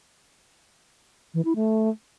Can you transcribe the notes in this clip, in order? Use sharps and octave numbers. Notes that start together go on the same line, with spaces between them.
E3
E4
A3